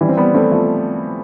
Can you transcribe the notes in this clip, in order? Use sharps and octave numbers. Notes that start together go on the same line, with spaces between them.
E3 G3
C4
G3 B3
A3 C4
F3 A3